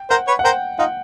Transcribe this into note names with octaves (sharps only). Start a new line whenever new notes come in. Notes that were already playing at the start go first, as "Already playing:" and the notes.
Already playing: G5
A#4 C5 F#5
B4 C#5
F#5
A#4 C5 G5
D#4 F4 F#5